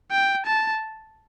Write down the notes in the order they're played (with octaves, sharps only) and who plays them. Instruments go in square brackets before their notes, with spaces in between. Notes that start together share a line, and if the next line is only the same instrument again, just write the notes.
[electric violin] G5
A5